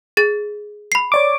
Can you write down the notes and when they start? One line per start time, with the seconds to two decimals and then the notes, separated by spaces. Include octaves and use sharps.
0.17 G#4 A6
0.92 B5 C7
1.12 C#5 D5 D6